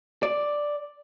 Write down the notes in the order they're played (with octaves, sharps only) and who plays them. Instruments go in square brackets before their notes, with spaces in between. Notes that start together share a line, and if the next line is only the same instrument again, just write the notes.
[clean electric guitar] D5